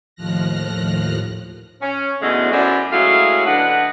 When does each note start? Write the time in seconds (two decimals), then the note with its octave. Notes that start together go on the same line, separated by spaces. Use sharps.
0.15 D#2 A2 F3 F6 F#6 A#6
1.82 C#4
2.21 E2 B2 D3 G#3 A3 C#4
2.52 F#2 E4 C5 D5
2.92 F#3 G#3 A3 C#4 E4 F5
3.46 D3 D4 B4 D#5 F#5